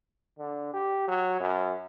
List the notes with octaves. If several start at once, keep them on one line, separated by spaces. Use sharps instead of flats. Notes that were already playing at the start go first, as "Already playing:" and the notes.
D3
G4
F#3
F#2